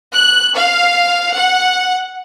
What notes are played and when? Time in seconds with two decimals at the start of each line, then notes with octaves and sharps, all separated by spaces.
0.11 F#6
0.55 F5
1.34 F#5